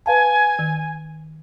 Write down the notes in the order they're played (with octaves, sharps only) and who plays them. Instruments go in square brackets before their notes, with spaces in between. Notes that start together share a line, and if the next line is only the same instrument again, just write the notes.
[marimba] B4 F5 A5 [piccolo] G#5
[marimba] D#3